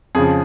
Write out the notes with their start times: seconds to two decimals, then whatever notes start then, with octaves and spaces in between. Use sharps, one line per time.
0.15 F2 C#3 F3 G#4